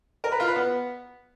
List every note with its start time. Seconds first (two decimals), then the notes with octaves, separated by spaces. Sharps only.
0.24 A#4
0.32 B4
0.40 F4
0.48 B4
0.56 B3